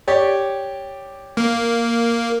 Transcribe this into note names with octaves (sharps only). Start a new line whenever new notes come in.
G4 C#5 D5
A#3